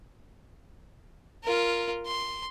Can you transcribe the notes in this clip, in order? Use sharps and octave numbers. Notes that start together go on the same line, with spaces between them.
F4 A#4
C6